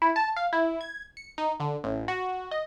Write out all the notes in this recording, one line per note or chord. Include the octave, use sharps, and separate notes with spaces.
E4
A5
F5
E4
G#6
C#7
D#4
D3
A1
F#4
D#5